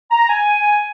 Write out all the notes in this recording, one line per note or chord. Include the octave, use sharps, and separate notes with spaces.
A#5
G#5